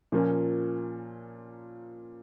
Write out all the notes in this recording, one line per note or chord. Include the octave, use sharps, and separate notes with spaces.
A#2 F3 A#3 C#4